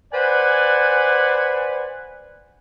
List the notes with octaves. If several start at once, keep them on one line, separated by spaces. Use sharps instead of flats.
B4 C5 D5 F#5 G#5